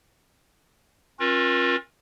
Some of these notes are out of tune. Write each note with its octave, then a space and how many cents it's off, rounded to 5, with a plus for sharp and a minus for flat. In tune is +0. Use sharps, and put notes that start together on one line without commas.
C#4 -35 F4 +25 A#4 +40